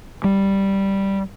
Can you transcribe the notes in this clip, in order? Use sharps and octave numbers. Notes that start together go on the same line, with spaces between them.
G3